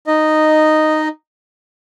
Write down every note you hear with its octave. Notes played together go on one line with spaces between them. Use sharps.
D#4 D#5